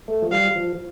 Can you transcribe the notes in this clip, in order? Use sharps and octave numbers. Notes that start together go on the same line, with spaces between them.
A3
F3
G3 F5
F3